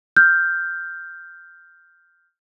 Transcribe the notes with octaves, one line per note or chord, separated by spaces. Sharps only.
F6 G6